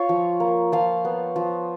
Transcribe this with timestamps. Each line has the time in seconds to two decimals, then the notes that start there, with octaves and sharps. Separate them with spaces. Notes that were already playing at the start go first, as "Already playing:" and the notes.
Already playing: F4 C#5 F5
0.09 F3
0.40 A#3
0.72 F3 F5
1.05 B3
1.36 F3